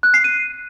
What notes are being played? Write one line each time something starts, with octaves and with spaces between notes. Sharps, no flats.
F#6
C7
D#7